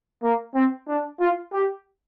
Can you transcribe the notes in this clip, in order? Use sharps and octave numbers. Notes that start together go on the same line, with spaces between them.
A#3
C4
D4
F4
G4